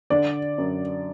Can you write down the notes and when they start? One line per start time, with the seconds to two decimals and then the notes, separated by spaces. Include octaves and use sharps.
0.10 D3 D5
0.58 F#2